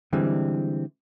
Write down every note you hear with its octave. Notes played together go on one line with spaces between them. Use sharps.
D3 E3 G3 G#3 C4